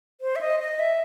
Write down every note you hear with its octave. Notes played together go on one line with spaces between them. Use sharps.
C5
E5
D#5
D#5
E5